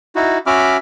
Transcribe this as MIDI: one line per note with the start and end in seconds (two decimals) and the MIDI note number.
0.16 0.38 63
0.16 0.38 64
0.16 0.38 66
0.46 0.77 61
0.46 0.77 66
0.46 0.77 76
0.46 0.77 83
0.46 0.77 86
0.46 0.77 89